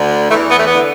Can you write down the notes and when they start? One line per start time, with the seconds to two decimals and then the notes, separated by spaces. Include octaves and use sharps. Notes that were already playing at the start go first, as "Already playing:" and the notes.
Already playing: D2 D3
0.29 E2 E3 A3
0.50 B3
0.59 A3
0.66 B3
0.72 D3